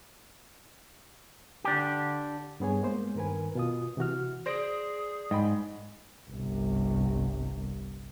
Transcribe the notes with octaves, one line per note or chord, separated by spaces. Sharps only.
D3 D4 G4
G2 G3 B3 G#4 C#5 G#5
G#3 A#3 B3 C5
G2 D#3 A#4 B4 G#5
B2 F4 D#6
C3 E3 F#4 F6
G#4 C5 D5 A#6 D7
G#2 D#5 G5 B5
G1 C2